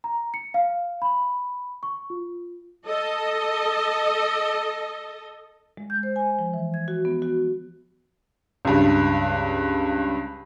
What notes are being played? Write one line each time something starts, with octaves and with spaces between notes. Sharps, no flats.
A#5
C#7
F5
B5
C#6
F4
A4 D#5
G#3
G6
C5
G#5
F3
E3
G#6
F#4
B3
F#4
C#2 G2